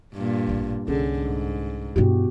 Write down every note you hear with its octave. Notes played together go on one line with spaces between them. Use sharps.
G2 A#2
A1 F2
C2 D3 C#4 G#4 A4
G#2
G2 B2 E4 F#4 G4